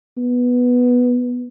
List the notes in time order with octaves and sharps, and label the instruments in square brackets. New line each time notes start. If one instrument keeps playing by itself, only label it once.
[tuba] B3